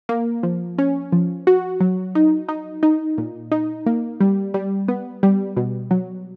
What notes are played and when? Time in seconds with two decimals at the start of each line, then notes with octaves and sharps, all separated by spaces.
0.09 A#3
0.43 F3
0.78 C#4
1.12 F3
1.47 F#4
1.80 F#3
2.15 D#4
2.48 D#4
2.83 D#4
3.18 A#2
3.52 D#4
3.86 A#3
4.20 G3
4.54 G3
4.88 B3
5.23 G3
5.57 B2
5.91 F#3